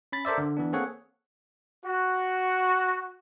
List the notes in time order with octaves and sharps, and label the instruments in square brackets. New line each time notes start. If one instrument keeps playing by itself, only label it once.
[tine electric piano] C#4 B5 A6
A4 A#4 C5 D5 E5
D3
E3 B3 D4
A#3 C4 G#4 A4 C#5 F#5
[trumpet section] F#4